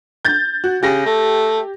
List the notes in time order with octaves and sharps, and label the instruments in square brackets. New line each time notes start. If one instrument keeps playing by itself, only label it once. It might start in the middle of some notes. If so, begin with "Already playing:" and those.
[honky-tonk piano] G6 A6
F#4
[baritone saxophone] C#3 [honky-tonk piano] G4 A#6
[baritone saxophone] A3